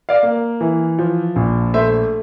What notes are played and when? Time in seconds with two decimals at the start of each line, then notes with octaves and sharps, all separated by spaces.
0.09 D5 F5
0.23 A#3
0.61 E3
0.99 F3
1.36 A#1
1.74 A3 C5 E5